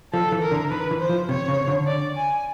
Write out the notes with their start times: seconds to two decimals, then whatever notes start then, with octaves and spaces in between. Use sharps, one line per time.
0.13 F3 A4
0.32 E3
0.42 A#4
0.51 D3
0.70 D#3 B4
0.91 E3
1.00 C5
1.09 F3
1.29 C3 C#5
1.48 C#3
1.68 D3
1.87 D5
2.16 G#5